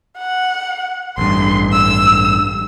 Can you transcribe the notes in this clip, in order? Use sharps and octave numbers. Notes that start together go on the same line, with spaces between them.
F#5
A1 G2 C6
E6